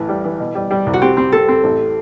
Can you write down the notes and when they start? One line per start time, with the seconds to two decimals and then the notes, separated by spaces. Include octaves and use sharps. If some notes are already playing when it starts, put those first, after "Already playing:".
Already playing: A1 A2 E3
0.09 G3
0.24 E3
0.40 B2
0.55 G3
0.71 G3
0.86 C2
0.93 F#4
1.02 C4 G4
1.17 C4
1.32 C4 A4
1.48 C4
1.64 A1